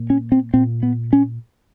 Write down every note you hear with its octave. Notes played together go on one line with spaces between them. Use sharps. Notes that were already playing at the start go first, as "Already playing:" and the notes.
Already playing: A#2
C#4
C4
A#2 C4
B3
C#4